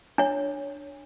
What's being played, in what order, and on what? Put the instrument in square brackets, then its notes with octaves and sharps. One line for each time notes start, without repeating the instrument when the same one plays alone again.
[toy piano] D4 C#5